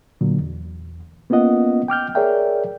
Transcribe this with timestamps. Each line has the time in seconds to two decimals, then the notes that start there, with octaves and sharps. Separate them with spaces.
0.21 A#2 D3 F#3
0.40 E2
1.30 A#3 B3 C#4 F4 D#5 F#5
1.88 G5 D6 F6 G6
2.15 G#4 A#4 C#5 D5 E5 G5